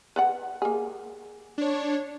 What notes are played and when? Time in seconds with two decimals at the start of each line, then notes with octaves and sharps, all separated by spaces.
0.16 B4 D5 F#5
0.62 A#3 G#4
1.58 D4 C#5